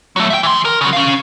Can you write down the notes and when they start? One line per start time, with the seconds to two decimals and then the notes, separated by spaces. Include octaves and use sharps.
0.16 F#3 A3
0.30 E5 G5
0.43 E3 C6
0.65 A#4
0.81 C#3 F#3
0.93 C#4 F5